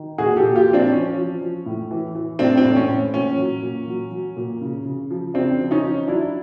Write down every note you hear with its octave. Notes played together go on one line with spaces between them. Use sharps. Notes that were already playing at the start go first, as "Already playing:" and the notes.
Already playing: D#3
A#2 F#4 G#4
G4 A4
A#2
F4 G4
F3
C4 D4
F3 C#4
F3
F3
A2
E3
E3
A2 C4 D4
C4 D4
A2
C#4
A2
A#2 C#4
F#3
A#2
F#3
F#3
A#2
C#3
C#3
F3
C#3 C4 D4
F3
C#4 D#4
F3
F#3 D4 E4